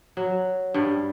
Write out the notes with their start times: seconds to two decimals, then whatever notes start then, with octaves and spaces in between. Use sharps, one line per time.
0.17 F#3
0.74 G2 G3